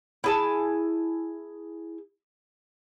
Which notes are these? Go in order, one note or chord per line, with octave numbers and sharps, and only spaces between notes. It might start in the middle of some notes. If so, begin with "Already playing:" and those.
E4 G#4 A5